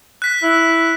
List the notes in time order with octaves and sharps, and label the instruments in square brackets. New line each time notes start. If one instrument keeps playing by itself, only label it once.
[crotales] F#6 B6
[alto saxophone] E4